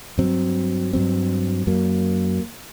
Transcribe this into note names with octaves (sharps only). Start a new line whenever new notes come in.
G2 F#3 C4
G2 F#3 C4
F#2 F#3 A#3